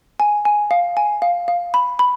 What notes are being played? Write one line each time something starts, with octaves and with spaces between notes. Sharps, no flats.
G#5
G#5
F5
G#5
F5
F5
B5
B5